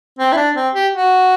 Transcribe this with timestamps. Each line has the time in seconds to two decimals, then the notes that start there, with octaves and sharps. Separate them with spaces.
0.19 C4
0.32 E4
0.37 D4
0.56 C4
0.74 G4
0.92 F#4